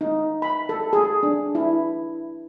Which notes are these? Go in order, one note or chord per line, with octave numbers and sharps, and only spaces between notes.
D#4
B5
A4
G#4
D4
E4